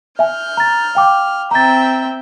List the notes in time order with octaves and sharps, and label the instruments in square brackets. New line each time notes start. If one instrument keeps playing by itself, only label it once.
[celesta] E5 G#5 [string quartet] F6 G6
[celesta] A#5 A6
F5 G5 D6
[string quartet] C4 E5 G5 [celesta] A#5 A6